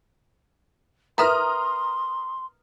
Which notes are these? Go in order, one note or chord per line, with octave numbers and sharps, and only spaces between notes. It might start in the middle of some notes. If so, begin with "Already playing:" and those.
A#4 B4 E5 A#5 C6 D#6 F6